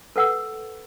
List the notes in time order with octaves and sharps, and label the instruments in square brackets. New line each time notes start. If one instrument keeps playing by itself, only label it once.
[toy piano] A4 B4 F#5 E6